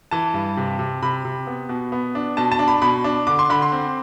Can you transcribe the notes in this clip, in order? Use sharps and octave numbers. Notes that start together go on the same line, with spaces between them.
E3 A5
G2
C3
C3
C3 B5
C3
B3
B2
B3
D4
B2 A5
A5
D4
B5
B2 B5
D4
D3 D6
C6
D3 B5
C6
C4